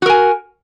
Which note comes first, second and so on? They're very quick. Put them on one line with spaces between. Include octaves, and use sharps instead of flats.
F#4 A#4 G#5